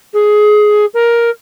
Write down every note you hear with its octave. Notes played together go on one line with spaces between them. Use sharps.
G#4
A#4